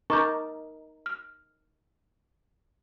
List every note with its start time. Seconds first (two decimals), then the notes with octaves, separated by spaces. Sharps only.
0.10 D#4 A#4 A5 C#6 D6 G6
1.06 F6